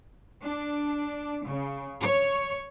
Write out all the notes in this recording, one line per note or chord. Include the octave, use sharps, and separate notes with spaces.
D4
C#3
C#5